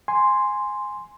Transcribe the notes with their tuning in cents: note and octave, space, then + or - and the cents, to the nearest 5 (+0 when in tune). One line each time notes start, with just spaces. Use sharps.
G#5 +0 C6 +0